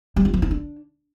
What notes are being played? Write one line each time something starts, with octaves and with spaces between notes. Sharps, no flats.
G3
F4
F3
E4
D4